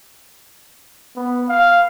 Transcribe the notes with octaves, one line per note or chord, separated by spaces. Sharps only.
B3
F5